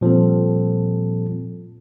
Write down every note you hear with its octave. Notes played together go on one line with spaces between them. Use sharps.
A#2 F3 G3 C4 A4